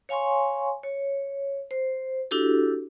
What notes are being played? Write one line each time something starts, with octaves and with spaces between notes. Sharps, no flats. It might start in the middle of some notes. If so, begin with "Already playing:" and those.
C#5 F5 G#5 C6 C#6
C#5
C5
D4 E4 F#4 G4 A4